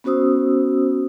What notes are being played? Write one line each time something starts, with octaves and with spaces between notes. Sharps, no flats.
B3 C#4 F#4 C5 D#6 E6